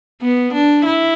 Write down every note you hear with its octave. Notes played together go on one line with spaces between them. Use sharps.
B3
D4
E4